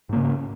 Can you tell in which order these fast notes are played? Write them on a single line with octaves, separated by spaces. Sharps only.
G#2 A#3 C#3